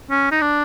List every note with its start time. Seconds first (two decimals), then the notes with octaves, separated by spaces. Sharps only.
0.11 C#4
0.32 D#4
0.42 D4